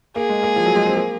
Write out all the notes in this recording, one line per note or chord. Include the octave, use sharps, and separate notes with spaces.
A#3 G#4
G#3
A#3
F3
F#3
G#3
C4
A#3